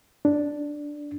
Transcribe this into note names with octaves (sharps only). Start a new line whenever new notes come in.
D4